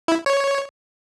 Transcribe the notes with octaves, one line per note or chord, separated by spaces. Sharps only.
E4
C#5